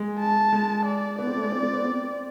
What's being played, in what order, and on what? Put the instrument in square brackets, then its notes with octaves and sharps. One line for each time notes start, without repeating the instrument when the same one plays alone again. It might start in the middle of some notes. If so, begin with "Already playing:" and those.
Already playing: [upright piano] G#3
[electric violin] A5
[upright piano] G#3
[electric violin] D5
[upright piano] B3 [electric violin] D5
[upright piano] C4
A3
G#3
C4
C4
B3
C4